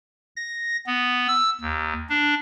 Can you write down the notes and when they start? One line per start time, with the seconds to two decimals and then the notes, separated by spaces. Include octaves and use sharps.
0.36 A#6
0.87 B3
1.28 E6
1.61 D#2
2.09 D4